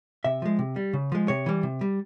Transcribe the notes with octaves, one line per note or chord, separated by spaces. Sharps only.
C3 E5
F3 G#3
C3
G3
C#3
F3 G#3
C3 C#5
E3 G3
C3
G3